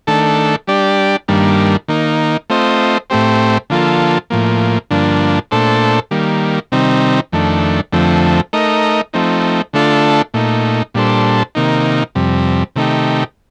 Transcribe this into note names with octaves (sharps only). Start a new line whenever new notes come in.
D#3 A3 D4 A4
G3 D4 G4 D5
G2 D#3 G3 A#3 D4
D#3 A#3 D#4
A3 C4 F4 C5 D#5
A2 A3 C4 G4 C5
D3 F3 A#3 F4 A4
A2 F3 A#3
G2 D3 F3 A#3 D4
A#2 A3 D4 A4 C5
D#3 G3 A#3
C3 D#3 G3 C4 D#4
F2 D#3 A3 D4
F2 D3 F3 A3 C4
A3 D#4 A#4 D#5
F3 A3 C4 D#4
D3 A3 D4 F4 A4
A#2 A3 D#4
A#2 G3 D4 A4 C5
C3 D#3 A#3 D#4
F2 C3 G3
C3 D#3 A3 D#4 G4